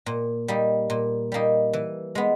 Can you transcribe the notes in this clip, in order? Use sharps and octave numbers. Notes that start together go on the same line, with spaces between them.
A#2
G3 A#3 D#4
A#2
G3 A#3 D#4
E3
G#3 B3